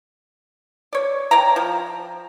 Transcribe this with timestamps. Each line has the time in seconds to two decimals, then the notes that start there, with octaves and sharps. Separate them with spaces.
0.93 C#5 D5
1.31 C#5 D5 G5 A#5
1.56 F3